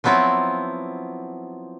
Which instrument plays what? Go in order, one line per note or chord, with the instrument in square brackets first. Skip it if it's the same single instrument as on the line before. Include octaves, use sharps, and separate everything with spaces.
[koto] F3 F#3 B3 C4 E4